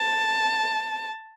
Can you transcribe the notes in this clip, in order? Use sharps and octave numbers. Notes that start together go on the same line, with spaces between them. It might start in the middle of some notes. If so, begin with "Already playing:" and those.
Already playing: A5